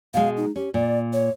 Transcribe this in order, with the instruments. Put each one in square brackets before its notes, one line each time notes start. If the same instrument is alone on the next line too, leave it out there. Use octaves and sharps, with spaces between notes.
[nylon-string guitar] B2 G#3 [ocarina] F5
[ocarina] D#4
[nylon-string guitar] C#4 [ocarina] G4
[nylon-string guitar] A#2 [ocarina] D5
[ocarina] C#5